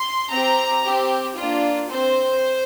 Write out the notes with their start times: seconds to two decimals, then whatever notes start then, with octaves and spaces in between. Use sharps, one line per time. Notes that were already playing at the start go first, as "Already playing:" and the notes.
Already playing: C6
0.30 C4 G4 A#5
0.83 C4 G4
1.36 A#3 D4 F4
1.89 C4 C5